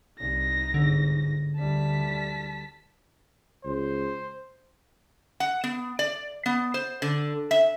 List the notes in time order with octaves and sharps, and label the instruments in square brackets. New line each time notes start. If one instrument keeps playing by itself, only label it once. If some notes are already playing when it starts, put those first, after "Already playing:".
[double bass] C2 [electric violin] D#4 A#6
[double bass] G1 G#2 [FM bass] D3
[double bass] D2 G3 [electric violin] A5 B6
[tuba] C#2 [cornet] C5
[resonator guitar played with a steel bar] F#5
B3
D5
B3
C5
D3
E5